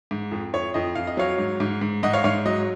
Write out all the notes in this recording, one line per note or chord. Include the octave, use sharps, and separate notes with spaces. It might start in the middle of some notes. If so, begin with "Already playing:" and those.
G#2
F2
F2 C#5
F2 D#5
F2 F5
D#5
F#3 C#5 F5
G#2
G#2
G#2
G#2 D#5 F#5
C#5 F5
G#2 C#5 F5
F#3 D#5